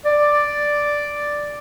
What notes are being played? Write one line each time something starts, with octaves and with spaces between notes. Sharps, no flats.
D5